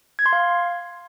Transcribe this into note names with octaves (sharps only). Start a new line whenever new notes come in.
G#6
C6
F5